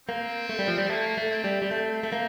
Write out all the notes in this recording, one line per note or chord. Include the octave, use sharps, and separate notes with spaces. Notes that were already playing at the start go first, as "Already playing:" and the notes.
A#3 C4
A3
G3
F3
G3
A3 A#3
A3
C4
G3
G3
A3 C4
A3
A#3